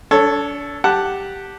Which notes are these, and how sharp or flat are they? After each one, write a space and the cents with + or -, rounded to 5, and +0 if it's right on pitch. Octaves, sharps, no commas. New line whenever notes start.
D4 -40 A4 +0 C#5 +0
G4 +0 F#5 +0 A5 +0